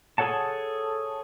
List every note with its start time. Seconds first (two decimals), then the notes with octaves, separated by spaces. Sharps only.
0.18 G#4 A4 C#5 F#5 A5